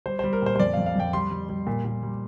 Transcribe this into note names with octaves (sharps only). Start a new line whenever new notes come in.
G3 C5
G3 C5
A#4
A#2 C5
C5
F2 D5
F2 F5
F5
F2 G5
G3 C6
G3
G3
A#2
A#2
G3